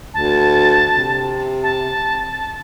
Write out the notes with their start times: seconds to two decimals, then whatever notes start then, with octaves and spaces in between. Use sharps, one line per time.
0.14 D2 A5
0.94 C3
1.63 A5